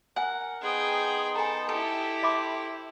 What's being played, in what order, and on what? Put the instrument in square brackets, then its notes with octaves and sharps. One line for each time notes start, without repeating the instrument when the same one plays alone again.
[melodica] A#4 [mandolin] F#5 [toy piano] G#5
[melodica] B3 D#4 C5 [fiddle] G#4 G5
[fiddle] A4 [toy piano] G#5 A#5
[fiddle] E4 G4 [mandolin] A4
[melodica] C5 [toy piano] E5 B5 D6